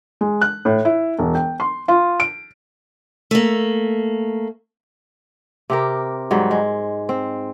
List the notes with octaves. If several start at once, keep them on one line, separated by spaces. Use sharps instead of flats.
G#3
F#6
A2
E4
E1
G5
C6
F4
D7
A3 A#3
C3 G4 A#4
G#2 F#3 G3
G#3
C4